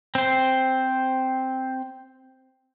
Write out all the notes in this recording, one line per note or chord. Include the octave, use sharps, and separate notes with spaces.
C4 C5